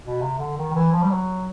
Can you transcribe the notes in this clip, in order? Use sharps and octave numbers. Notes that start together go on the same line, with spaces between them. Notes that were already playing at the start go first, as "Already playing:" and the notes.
B2
C3
D3
D#3
D#3
E3
F3
G3
F#3